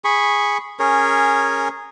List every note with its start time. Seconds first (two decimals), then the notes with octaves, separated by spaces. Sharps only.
0.04 G#4 B5 C#6
0.79 C#4 G#4 A#4 C#5